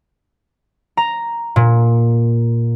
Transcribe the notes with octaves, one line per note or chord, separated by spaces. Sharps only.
A#5
A#2